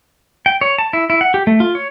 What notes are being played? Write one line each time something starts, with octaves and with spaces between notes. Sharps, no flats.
G5
C#5
A5
E4
E4
F#5
G4
A3
F4
C#5